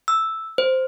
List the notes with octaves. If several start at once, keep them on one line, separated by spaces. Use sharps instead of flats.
E6
C5